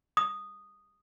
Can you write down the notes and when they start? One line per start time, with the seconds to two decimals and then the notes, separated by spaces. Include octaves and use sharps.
0.17 D#6